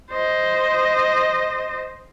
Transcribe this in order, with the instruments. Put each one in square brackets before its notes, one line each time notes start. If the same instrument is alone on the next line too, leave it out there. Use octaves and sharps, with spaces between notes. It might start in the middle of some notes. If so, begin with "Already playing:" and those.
[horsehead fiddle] C5 D#5